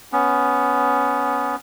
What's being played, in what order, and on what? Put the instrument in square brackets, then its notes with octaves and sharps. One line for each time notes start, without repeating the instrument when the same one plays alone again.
[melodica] B3 C#4